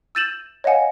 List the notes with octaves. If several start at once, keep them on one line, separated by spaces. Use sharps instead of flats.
E6 G6 A6 D#7 E7 F#7
C#5 D#5 F5 F#5 G#5